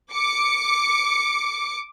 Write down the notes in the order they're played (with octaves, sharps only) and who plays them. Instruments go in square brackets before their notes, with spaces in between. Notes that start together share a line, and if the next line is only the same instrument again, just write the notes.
[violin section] D6 C#7